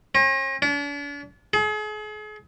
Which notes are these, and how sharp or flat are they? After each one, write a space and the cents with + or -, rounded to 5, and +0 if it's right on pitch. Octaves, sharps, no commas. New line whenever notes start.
C#4 -45
D4 -40
G#4 +40